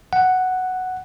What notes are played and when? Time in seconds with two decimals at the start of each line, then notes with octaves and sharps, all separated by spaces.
0.13 F#5